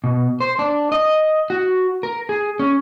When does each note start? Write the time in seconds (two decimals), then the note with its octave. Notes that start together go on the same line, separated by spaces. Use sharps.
0.04 B2
0.40 C5
0.59 D4
0.92 D#5
1.50 F#4
2.03 A#4
2.29 G#4
2.59 C#4